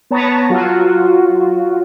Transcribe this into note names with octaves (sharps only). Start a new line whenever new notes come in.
B3 B4 C#5 A5 A#5
F#3 F4 F#4